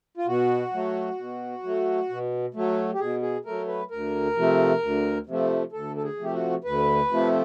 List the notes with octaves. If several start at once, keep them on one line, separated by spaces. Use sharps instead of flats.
F4
B2 F#4
F#3 A3
B2
F#3 A3
B2
F#3 A3
G4
B2 G#4
G#4
F#3 A3 A#4
B4
D2 A#4
C3 F3 A3
D2
C3 F3 A3
D2 A4
A4
G#4
C3 F3 A3 G4
F#4
D2 B4
C3 F3 A3